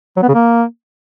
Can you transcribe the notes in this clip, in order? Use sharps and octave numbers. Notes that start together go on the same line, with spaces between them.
F#3
B3
C#3
A#3